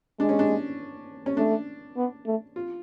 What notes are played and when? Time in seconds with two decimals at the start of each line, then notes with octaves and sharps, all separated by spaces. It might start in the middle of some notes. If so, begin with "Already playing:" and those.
0.19 G#3 D4
0.29 C#4
0.39 D4
1.26 C#4
1.37 A3 D4
1.97 B3
2.26 A3
2.56 F4